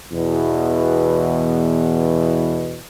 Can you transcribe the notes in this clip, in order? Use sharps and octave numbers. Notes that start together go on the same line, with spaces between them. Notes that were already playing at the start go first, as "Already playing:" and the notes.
E2 B2